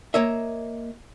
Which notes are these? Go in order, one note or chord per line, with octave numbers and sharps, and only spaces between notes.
A#3 C#5 D#5 E5